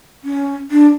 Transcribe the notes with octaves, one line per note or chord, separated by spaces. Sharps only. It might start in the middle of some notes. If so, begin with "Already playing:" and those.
C#4
D4